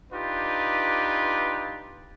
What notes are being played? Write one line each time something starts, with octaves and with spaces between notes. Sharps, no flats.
D4 D#4 F4 G4 B4